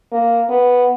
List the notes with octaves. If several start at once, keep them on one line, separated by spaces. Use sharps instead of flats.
A#3
B3